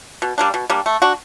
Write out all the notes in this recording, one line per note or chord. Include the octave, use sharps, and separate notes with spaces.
B2
G3 A#3 D4
B2
G3 A#3 D4
A3
D4 F#4